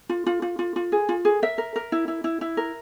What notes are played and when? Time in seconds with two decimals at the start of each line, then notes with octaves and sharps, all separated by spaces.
0.09 F4
0.26 F4
0.42 F4
0.59 F4
0.76 F4
0.92 G#4
1.09 F4
1.25 G#4
1.42 A#4 E5
1.58 A#4
1.76 A#4
1.92 E4
2.08 E4
2.24 E4
2.41 E4
2.57 A#4